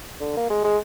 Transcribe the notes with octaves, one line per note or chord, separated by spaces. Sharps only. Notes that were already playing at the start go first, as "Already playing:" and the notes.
D3
A#3
G#3
G#3